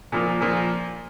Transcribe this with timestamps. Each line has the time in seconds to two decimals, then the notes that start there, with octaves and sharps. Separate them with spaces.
0.12 A#2 F3 A#3
0.40 A#2 F3 A#3